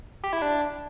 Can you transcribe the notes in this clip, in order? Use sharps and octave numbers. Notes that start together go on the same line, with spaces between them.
G4
E4
D4